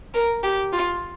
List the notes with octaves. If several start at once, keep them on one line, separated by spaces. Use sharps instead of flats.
A#4
G4
F4